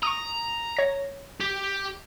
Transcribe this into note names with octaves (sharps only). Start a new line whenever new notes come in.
A#5 C#6 D#6
C#5 A#6
G4